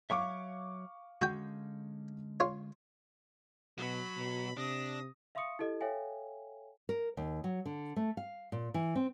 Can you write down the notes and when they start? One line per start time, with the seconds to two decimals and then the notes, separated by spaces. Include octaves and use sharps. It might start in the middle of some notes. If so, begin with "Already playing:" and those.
0.10 F#3 C#5 E5 F5 C#6 D6
1.22 D3 G#3 C#4 F#4 G5
2.40 F4 C#5
3.78 B2 F#3 B5
4.17 B2
4.57 C3 D4 D#6 A#6
5.35 E5 F5 C6 C#6 D#6 C#7
5.59 E4 G4 A4 D#5
5.81 A4 C#5 E5 F5 G5 G#5
6.89 A#4
7.17 D#2
7.44 F#3
7.66 D3
7.96 A3
8.17 F5
8.52 A#2
8.74 E3
8.95 C4